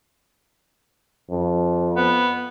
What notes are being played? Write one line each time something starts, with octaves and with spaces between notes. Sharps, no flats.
F2
B3